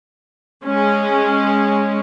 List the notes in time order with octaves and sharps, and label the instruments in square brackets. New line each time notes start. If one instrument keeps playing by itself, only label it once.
[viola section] G#3 C#4